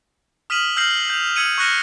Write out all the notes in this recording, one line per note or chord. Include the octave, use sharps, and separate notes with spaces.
D#6 F6 B6 D#7 E7 F#7
E6 F6 G6 A#6 C7 F#7
G6 F7
E6 G#6 C#7 D#7 F#7
C#6 F6 F#6 A#6 C#7 E7